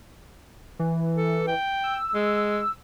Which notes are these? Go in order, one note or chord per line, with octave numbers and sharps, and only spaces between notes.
E3
A4
G5
E6
G#3